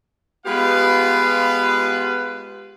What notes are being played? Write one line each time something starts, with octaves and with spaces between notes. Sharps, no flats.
G#3 B3 F4 G4 B4 F5